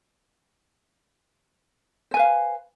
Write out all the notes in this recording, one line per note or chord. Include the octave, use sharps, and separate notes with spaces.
B4 C5 F5 G#5